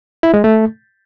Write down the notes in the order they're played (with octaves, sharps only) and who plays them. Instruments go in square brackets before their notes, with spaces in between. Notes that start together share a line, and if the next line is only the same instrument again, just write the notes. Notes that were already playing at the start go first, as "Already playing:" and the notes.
[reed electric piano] E4
G#3
A3